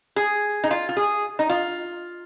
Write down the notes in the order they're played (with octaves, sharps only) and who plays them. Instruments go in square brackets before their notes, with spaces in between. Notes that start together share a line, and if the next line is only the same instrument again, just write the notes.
[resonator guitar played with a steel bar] G#4
D#4
F4
F4
G#4
D#4
F4